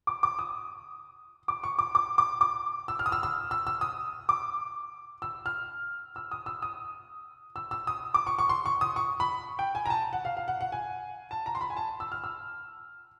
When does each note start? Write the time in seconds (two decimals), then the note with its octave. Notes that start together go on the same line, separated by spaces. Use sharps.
0.07 D6
0.23 D6
0.39 D#6
1.48 D6
1.63 C#6
1.79 D6
1.95 D6
2.18 D6
2.41 D6
2.88 E6
2.99 F6
3.06 D#6
3.12 E6
3.23 E6
3.51 E6
3.67 E6
3.81 D#6
4.29 D6
5.22 E6
5.46 F6
6.16 E6
6.31 D#6
6.46 E6
6.62 D#6
7.56 E6
7.71 E6
7.87 D#6
8.14 D6
8.27 C#6
8.38 C#6
8.49 C6
8.66 C#6
8.81 D#6
8.96 C#6
9.20 B5
9.59 G5
9.75 G#5
9.86 A#5
9.90 A5
10.13 F#5
10.25 F5
10.37 F5
10.48 F#5
10.61 F#5
10.72 G#5
11.31 A5
11.46 A#5
11.55 C6
11.61 B5
11.70 G#5
11.77 A5
12.00 E6
12.12 F6
12.24 E6